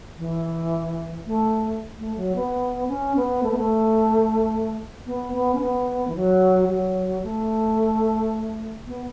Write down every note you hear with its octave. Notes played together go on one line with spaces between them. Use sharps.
E3
A3
A3
F#3
B3
C#4
B3
A3
B3
A3
B3
B3
C#4
B3
E3
F#3
F#3
A3
B3